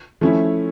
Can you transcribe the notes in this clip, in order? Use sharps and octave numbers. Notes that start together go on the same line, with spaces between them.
F3 A3 C#4 E4